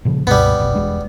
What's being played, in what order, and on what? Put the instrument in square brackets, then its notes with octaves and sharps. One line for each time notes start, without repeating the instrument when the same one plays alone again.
[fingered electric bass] A#2 C#3 F3
[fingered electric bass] C#2 G2 B2 [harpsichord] G3 B3
[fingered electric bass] F1 B1
E1 G#3 D4